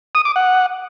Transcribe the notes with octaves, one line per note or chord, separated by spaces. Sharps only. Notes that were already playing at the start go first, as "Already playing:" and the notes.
D#6
D6
F#5